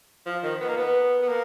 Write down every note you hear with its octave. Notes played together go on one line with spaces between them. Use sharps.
F3
D#3
B3
A#3
B3
B3
A#3